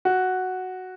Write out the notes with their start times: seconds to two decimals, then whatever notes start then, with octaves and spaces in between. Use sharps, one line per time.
0.05 F#4